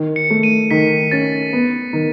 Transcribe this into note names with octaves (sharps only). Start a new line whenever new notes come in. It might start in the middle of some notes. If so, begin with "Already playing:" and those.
Already playing: D#3
C#7
A3
D#7
D#3 B6
C#4 A6
B3
D#3